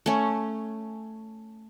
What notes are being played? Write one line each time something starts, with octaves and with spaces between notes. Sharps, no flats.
A3 C#4